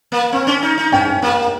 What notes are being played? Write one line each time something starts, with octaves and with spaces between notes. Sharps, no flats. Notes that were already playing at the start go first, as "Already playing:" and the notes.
A#3
C4
C#4
D#4
D#4
C#4 G5
A#3